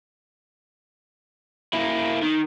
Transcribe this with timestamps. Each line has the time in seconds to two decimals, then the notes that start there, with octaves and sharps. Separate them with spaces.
1.74 A#3 E4
2.23 D#3